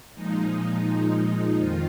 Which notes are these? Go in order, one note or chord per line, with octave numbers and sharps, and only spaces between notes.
A#2 F3 G#3 D#4
F2 D#3 F4